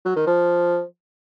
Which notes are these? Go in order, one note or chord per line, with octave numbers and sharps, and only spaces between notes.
F#3
D#3
F3